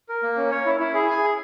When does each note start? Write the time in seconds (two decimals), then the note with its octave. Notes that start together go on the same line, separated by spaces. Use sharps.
0.09 A#4
0.23 A#3
0.37 C#4
0.51 C#5
0.65 E4
0.80 E4
0.94 G#4
1.09 G#5
1.24 G#4